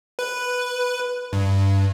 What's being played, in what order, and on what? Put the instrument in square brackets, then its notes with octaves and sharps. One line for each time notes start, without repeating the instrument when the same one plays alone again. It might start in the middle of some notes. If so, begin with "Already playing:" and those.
[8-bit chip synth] B4
G2